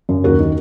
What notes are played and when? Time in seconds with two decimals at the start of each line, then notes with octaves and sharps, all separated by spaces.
0.09 F#2
0.24 D#2 F#4 A#4
0.39 D#3